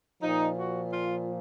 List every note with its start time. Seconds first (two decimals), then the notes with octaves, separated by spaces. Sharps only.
0.22 A#2 F3 D#4
0.57 F#4
0.92 F4